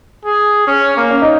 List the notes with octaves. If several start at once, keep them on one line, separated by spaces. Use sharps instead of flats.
G#4
C#4
A#3
C#4
D#4